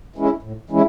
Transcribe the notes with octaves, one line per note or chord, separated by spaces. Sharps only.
E3 G#3 C#4 E4
A2
E3 G#3 C#4 E4